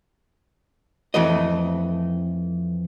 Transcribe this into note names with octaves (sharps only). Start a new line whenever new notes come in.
F2 E3 A3 D#5